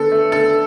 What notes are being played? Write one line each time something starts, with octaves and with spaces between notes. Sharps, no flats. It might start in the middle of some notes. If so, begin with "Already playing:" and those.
Already playing: D3 B3 A4
A3
D3 A4